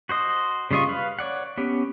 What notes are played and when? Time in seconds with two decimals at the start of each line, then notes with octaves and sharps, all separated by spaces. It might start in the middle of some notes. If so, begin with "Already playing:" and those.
0.09 F#4 C5 D#5
0.71 C#3 G3 F4 D#5 C#6
0.89 B4 F5
1.19 C#5 D5 F#5
1.57 B3 C#4 G4